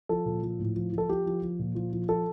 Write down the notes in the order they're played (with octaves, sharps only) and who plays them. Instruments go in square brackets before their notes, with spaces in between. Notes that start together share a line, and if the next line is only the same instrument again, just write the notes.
[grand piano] F3 A4
A#2
F3
A2
F3
F3
A4
F3 G4
F3
F3
A#2
F3
F3
F3 A4